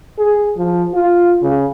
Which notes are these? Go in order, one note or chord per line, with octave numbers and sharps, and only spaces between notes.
G#4
F3
F4
C#3